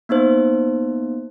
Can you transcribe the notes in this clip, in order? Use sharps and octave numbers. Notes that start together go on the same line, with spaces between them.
A#3 B3 D#4 C5